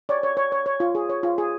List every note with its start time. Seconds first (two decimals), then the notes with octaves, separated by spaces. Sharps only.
0.09 C#5 D5
0.23 C#5
0.37 C#5
0.52 C#5
0.66 C#5
0.80 F4
0.95 G#4
1.09 C#5
1.23 F4
1.38 G#4